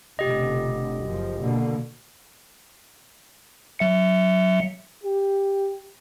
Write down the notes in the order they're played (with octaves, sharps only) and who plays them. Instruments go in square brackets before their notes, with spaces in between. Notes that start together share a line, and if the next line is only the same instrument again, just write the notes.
[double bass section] F1 B2 D3 [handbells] G4 D#5
[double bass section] F#1 F#2 F3
B2 D3 A#3
[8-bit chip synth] F#3 E5 C#7
[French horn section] G4